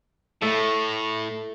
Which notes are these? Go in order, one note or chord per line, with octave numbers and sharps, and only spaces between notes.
A2 A3 A4